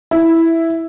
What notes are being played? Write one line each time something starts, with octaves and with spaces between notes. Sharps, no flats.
E4